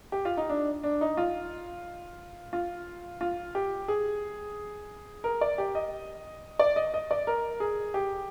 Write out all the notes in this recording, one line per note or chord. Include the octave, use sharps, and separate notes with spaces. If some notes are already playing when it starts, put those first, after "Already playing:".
G4
F4
D#4
D4
D4
D#4
F4
F4
F4
G4
G#4
A#4
D5
G4
D#5
D5
D#5
D#5
D5
A#4
G#4
G4